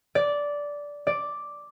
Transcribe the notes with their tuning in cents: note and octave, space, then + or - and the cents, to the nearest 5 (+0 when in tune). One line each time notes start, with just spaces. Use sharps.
D5 -10
D5 +0